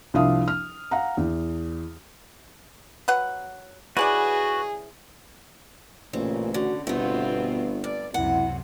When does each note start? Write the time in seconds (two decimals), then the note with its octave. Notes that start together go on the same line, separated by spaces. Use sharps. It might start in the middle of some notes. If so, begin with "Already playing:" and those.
0.14 C2 F3 D4 E5 F5 D#6
0.48 F6
0.91 F5 F#5 A#5
1.17 E2
3.08 F#3 B4 F#5
3.97 E3 C#4 F#4 G#4 B4 D5
6.13 A1 A#2 C#3 C4
6.54 D3 F#4
6.87 G1 B2 A3 B3 C4 E4 F4
7.84 G2 D5
8.14 C#2 F#2 C3 E4 F#5